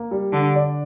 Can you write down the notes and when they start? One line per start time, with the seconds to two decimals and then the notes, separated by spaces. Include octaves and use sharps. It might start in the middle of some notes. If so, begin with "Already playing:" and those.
Already playing: A#3
0.11 G3
0.32 D3 D4
0.55 D5